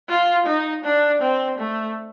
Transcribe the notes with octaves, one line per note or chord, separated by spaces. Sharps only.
F4
D#4
D4
C4
A3